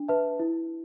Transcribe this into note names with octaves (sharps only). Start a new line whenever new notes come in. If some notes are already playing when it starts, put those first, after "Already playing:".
Already playing: D4
B4 E5 A5
E4